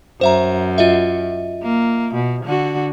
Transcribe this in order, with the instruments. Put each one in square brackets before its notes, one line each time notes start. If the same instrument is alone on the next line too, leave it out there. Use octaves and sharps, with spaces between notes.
[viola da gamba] F#2 [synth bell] C5 E5 A#5
[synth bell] F4 D#5 E5
[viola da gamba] A#3
B2
D3 F#4